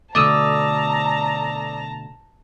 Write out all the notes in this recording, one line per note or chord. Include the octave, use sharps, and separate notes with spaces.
B2 D3 A3 D5 A5 A#5 D#6 E6